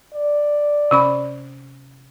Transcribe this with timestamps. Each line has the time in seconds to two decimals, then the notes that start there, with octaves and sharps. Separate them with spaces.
0.14 D5
0.91 C3 C#4 B5